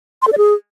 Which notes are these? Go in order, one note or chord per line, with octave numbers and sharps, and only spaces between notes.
C6
A4
D5
G#4